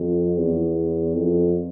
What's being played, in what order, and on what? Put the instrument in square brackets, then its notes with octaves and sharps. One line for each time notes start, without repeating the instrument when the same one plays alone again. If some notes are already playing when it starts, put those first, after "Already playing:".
Already playing: [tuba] F2
E2
F2